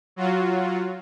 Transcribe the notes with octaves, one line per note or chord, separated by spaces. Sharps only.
F#3 F4 F#4